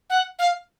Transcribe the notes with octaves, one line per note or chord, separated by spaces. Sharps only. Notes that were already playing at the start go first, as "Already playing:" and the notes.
F#5
F5